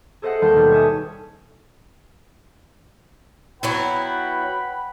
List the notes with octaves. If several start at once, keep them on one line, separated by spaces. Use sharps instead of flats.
G#4 A4 C5 D#5 E5 F#5
D#2 G3 A5 C6 G6
B2 G3
C#5 E5 G#5 A5 D#6
F#3 B3 E4 B4 F#5 G5 B5